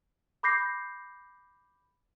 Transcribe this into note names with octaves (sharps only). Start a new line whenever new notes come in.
B5 D6 G6 A#6 C7